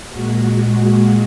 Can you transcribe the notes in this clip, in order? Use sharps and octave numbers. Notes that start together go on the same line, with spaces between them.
A#2 G#3 F#4